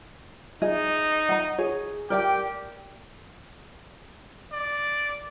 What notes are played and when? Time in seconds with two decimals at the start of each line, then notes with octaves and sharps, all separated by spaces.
0.62 D#4 G#4 D#5
1.29 F#5 A#5
1.58 G#4 C#5
2.10 G4 A#4 D5 G5
4.52 D5